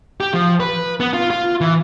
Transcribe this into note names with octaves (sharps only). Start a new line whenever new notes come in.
G4
F3
B4
B3
F4
F4
E3